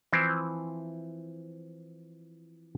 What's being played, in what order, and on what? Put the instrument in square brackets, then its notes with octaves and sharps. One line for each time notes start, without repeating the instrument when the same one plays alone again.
[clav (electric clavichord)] E3 F3 C4 E4